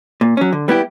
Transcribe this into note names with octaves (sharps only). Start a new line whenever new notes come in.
A#2
F#3 C#4
D3
G3 B3 E4 G4